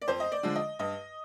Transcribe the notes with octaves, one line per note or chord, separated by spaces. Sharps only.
D5
F2 C5
D#5
D5
D3 F3 G#3
D#5
G2 D#5